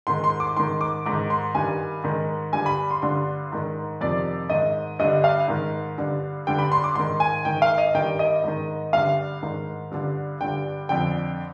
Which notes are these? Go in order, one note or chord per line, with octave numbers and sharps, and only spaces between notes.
G#2 D#3 C6
C6
D6
G#2 D#3 C6
D6
G#2 D#3 D6
C6
G2 D#3 G#5
G#2 D#3
G2 D3 G#5
B5
C6
G2 D3 C6
G#2 D#3
F2 C3 D#3 D5
G#2 D#3 D#5
G2 D3 D#5
F5
G#2 D#3
G2 D3
G2 D3 G5
B5
C6
D6
G#2 D#3 C6
G#5
G#2 D#3 G5
F5
D#5
G2 D#3 G5
D#5
G#2 D#3
G2 D3 F5
G#2 D#3
G2 D3
G2 D3 G5
F2 D3 G5